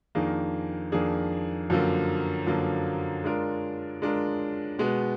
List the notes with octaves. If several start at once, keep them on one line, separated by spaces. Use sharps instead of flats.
F2 D#3 A#3 D4 G#4
F2 D#3 A#3 D4 G#4
F#2 D3 F3 A#3
F#2 D3 F3 A#3
G#3 D4 F4 A#4
G#3 D4 F4 A#4
B2 G#3 B3